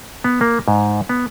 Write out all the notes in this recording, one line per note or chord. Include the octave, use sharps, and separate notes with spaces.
B3
A#3
G#2
B3